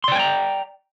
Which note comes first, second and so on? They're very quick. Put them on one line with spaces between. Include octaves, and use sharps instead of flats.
C6 D5 G5 G#5 A#5